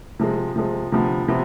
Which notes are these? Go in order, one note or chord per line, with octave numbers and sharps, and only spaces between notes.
C3 F3 G#3
C3 F3 G#3
D2 C3 F3 B3
C3 F3 B3